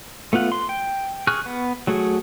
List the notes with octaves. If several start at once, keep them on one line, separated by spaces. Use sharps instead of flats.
A3 B3 F4 F#5
C6
G5
G#4 C#6 F6 F#6
B3
F#3 A3 F#4 G#4